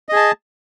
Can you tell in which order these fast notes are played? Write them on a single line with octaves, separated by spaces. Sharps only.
D#5 G#4 A5